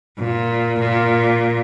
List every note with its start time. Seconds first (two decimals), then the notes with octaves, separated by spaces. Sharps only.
0.19 A#2
0.80 A#2